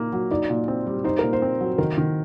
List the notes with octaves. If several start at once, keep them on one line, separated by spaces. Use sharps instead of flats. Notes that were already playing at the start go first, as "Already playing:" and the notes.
Already playing: A#2 A#3 D#4
F#3
D#4 D5
A#2
C4
G3
D#4 C5
A#2 A#4
C5
C4
F#3
D#3 A#4
D#3